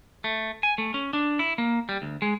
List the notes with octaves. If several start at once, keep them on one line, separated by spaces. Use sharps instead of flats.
A3
G#5
A3
C#4
D4
E4
A#3
G3
D2
G#3